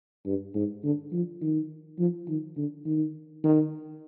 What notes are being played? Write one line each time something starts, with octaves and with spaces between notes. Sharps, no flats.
G2
G#2
D3
F3
D#3
F3
D#3
D3
D#3
D#3